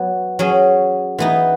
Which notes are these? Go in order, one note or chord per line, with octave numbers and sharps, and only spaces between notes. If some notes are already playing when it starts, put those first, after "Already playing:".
Already playing: F#3 B3
F#3 C#4 G#4
E3 B3 D#4